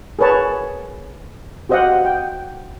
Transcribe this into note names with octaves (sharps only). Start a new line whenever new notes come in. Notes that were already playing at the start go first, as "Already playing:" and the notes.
G#4 A#4 B4 C#5 A5
F#4 G4 C5 D#5 F5 F#5
G5